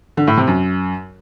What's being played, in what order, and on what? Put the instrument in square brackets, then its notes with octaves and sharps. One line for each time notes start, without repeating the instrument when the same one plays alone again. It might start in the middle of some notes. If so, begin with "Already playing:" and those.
[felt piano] D3
A2
C3
F#2